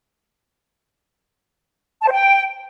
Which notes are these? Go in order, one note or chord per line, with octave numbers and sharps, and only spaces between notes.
A5
C5
G5